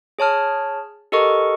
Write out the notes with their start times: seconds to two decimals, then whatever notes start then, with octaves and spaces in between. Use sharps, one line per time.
0.19 G#4 C#5 A5 F6
1.12 G4 A4 A#4 D#5 C#6